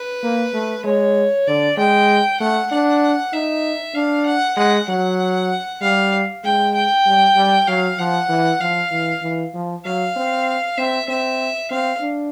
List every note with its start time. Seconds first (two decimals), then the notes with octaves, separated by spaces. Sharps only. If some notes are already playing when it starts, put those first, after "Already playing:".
Already playing: B4
0.23 A#3
0.54 A3
0.84 G#3 C#5
1.47 D3 D5
1.77 G#3 G5
2.40 A3 F#5
2.71 D4 F#5
3.33 D#4 E5
3.95 D4 F5
4.26 F#5
4.57 G#3 F#5
4.89 F#3 F#5
5.81 G3 F5
6.44 G#3 G5
6.75 G5
7.06 G3
7.36 G3
7.67 F#3 F5
7.98 F3 F#5
8.29 E3
8.60 F3 F5
8.91 E3
9.22 E3
9.54 F3
9.85 F#3 F5
10.16 C4
10.78 C4 E5
11.09 C4 E5
11.71 C4 F5
12.01 D4